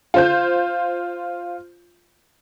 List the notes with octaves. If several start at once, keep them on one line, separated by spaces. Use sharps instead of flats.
F4 C5 G6